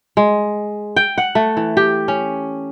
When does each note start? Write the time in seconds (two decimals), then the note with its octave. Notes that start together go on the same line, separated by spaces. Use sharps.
0.17 G#3
0.96 G5
1.18 F#5
1.35 A3
1.57 E3
1.77 G4
2.08 C#4